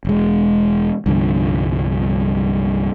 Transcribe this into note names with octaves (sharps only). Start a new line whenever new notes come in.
E1 G#3
C2 G2 D3 F3